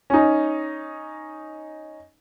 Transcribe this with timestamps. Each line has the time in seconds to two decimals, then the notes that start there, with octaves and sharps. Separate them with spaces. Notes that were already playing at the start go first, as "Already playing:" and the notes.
0.10 C#4 D#4